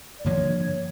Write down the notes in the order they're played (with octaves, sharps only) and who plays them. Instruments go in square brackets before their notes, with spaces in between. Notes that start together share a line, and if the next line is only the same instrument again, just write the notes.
[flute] D5
[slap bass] G2 D3 F3 A#3 [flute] C#5